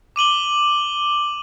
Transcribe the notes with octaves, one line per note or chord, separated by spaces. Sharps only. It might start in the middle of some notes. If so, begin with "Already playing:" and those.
D6 D#7 F#7 G7